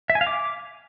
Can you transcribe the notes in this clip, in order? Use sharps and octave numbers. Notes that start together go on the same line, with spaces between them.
E5
G#5
F5
D6